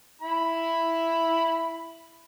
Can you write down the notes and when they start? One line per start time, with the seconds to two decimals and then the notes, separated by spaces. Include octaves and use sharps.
0.21 E4 B5